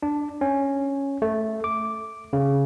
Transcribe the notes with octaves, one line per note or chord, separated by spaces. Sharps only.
D4
C#4
A3
D6
C#3